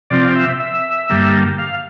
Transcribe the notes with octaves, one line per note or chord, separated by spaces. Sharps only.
C3 F3 C4 D5
E5
E5
G2 D3 G3 A#3
F5